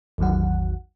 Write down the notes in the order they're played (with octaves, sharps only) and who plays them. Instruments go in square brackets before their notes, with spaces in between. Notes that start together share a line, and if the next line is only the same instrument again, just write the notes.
[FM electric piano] A1 E2 D#3 F#3 F#5